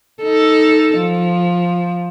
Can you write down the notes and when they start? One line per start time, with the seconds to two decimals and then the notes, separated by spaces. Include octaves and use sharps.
0.23 D#4 A4
0.99 F3